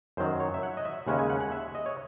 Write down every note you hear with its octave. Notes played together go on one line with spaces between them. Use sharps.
F#2 D#3 F#3 C5
C#5
E5
F#5
D#5
E5
D#2 C#3 G#3 C#4 F#5
G#5
F#5
F#5
E5
D#5
C#5